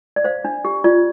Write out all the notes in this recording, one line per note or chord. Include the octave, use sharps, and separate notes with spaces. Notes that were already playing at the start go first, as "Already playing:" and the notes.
D5
C5 F5
D4
G4
F4 D5